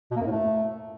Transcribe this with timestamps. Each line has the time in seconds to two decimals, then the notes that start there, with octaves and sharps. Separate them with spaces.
0.11 B2
0.16 A#3
0.21 F#2
0.26 A2
0.31 A3